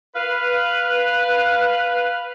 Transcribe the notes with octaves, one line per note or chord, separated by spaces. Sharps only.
B4 F5